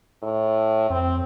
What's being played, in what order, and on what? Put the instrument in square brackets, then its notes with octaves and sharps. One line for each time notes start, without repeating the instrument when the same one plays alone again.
[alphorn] A2
[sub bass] F2 [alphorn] C4